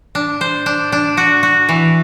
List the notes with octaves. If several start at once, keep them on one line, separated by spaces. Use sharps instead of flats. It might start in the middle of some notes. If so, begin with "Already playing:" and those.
D4
C5
D4
D4
F#4
F#4
E3